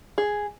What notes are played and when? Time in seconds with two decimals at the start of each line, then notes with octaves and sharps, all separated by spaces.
0.18 G#4